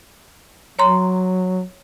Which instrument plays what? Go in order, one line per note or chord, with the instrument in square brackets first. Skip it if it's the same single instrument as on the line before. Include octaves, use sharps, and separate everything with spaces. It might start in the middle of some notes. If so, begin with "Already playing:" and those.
[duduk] F#3 [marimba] C#5 A#5 C6